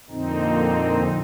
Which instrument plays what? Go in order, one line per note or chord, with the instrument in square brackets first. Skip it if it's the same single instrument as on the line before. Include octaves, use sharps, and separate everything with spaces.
[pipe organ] F2 A#2 D3 C4 D#4